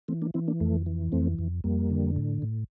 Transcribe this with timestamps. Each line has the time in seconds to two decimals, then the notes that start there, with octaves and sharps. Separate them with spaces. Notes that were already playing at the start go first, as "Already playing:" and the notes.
0.08 E3 A3 C4
0.22 A#3 D4
0.34 E3 C4 E4
0.48 A#3 D4
0.60 F2 A3
0.86 E3
1.12 F2 A3 C4
1.39 F2
1.64 F2 G3 A#3
1.90 D3
2.16 A2
2.42 A2